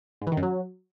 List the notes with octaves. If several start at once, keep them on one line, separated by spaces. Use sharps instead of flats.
G#2
E3
D#3
F#2
F#3